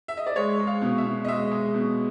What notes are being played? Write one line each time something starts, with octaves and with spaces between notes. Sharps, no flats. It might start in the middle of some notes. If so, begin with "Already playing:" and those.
E5
D#5
D5
G#3 C#5
G#3
F5
B2
E5
B2
D#5
G#3 E5
G#3
B2